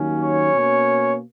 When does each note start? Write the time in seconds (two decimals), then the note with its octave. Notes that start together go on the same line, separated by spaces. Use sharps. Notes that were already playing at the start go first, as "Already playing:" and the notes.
Already playing: D#2 D#3 F#3 A#3 C#4
0.19 C#5
0.53 B2 A#3 C#4